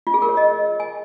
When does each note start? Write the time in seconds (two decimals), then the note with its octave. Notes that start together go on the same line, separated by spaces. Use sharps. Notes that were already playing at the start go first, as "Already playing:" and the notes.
0.07 F4
0.14 G#4
0.22 A#4
0.29 C#5
0.37 D#5
0.80 G#5